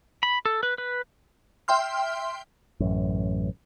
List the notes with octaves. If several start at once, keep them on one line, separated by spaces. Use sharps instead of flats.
B5
A4
B4
B4
E5 G5 C6 F6
A1 F#2